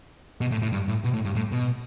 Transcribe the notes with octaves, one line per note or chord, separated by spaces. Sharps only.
B2
A2
A2
G2
A2
B2
A2
G2
A2
B2